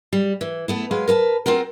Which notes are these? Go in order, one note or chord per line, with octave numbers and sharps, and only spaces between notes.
G3
E3
A3 B3 E4
F#3 G#3 B4 F5
A#4 B4 F5 A5
C4 F4 F#4 A#4